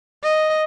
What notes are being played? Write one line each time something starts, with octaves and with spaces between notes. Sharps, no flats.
D#5